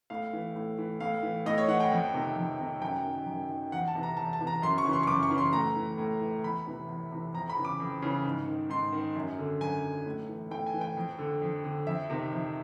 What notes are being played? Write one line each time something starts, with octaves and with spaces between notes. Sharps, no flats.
A2 F5
E3
A2
E3
A2 F5
E3
A2 D#5
C#5
E3 F#5
G5
F2
C3 D#3
F2
C3 D#3
F#2 G5
D#3
F#2
D#3
E2 F#5
A5
C3 E3
A#5
E2 A5
A5
C3 E3
A#5
F#2 C6
C#6
C#3 E3
C6
C#6
F#2 D6
C#6
C#3 E3
C6
A2 A#5
E3
A2
E3
E2 B5
C3 E3
E2
C3 E3
F2 A#5
B5
C#3 E3
D6
F2
C#3 E3
G#2
D#3
G#2 C6
D#3
F#2
D3
F#2 G#5
D3
A2
E3
A2 G5
G#5
E3
G5
F2
D3
F2
D3
F2 E5
C3 D#3
F2